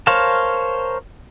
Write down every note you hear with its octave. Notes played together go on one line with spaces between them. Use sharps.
A#4 C5 C#5 F5 A5